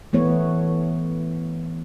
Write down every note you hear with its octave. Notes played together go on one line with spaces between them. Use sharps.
E3 A3 B3 C#5